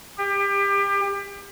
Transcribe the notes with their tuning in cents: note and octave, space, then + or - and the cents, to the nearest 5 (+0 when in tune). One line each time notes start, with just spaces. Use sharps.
G4 +30